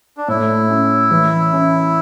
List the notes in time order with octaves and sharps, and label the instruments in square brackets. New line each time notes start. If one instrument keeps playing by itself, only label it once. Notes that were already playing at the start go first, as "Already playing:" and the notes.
[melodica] D4
[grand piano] A2 [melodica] E4
[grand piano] C#4
E3
C#4